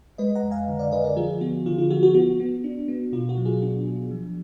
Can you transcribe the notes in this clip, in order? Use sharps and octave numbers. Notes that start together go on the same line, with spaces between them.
G#3 B4 D#5
F#5 A#5
F2
F5 G#5
D3
D5 F5
D3 B4 D#5
A#4 D5
F3 F4 G#4
B3 F#4
D3 F4
F4
F3 F#4
F#4
B3 F#4
B3
D4
B3
B2 F4
F#4
F#3
F4 G#4
D4 F#4
D4
F3